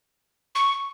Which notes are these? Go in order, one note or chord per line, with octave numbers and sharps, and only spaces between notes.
C#6